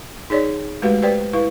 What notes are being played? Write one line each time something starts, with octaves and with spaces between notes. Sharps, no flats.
D#4 G#4 C#5 D5
G#3 A3 F#4 G4 B4 F5
G4 B4 C5 D5 G5
E4 B4 F5